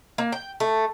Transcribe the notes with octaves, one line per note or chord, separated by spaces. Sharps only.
A#3
G5
A3